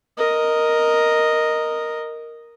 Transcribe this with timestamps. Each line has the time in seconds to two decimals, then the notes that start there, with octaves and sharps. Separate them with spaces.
0.18 A#4 D#5